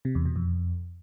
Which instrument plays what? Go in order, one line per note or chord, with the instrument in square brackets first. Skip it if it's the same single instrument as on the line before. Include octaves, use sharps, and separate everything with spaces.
[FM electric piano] C3
E2
B2
F2